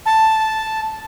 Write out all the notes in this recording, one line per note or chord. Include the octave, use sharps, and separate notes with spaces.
A5